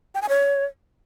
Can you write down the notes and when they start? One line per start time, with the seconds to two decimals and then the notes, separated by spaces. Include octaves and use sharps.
0.15 G5
0.22 G#5
0.29 C#5